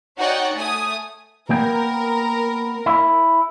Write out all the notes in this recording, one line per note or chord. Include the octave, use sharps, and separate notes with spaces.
D#4 F#4 C#5 D5 F#5 G5
A3 G#5 D#6
A#3 B3 A#4 G5
E4